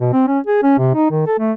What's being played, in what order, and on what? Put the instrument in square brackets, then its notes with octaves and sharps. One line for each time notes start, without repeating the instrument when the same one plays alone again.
[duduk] B2
C4
C#4
G#4
C#4
C3
D#4
D#3
A4
A3